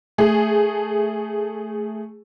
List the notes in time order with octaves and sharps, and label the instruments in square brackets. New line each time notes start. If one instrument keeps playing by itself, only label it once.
[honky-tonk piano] A3 G#4